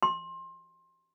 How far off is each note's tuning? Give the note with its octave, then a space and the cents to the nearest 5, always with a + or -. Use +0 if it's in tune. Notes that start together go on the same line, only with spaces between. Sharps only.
C6 +25